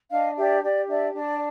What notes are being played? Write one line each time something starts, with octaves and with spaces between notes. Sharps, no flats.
D4 D#5 F5
G4 D5 E5
G4 D5
D4 D5 E5
D4 D5